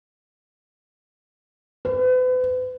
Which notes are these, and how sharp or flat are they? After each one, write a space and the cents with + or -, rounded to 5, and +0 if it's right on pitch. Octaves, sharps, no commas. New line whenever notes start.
B4 +40